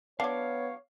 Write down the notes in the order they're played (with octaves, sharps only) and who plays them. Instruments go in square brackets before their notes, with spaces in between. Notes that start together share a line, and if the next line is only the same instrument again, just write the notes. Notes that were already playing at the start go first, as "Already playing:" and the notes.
[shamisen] F#3 D4 [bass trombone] B3 [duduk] C#5 [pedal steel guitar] F5 D6